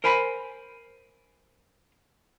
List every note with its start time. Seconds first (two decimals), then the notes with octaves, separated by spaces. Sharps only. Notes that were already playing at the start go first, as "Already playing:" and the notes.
0.04 A#4 C5 G#5 B5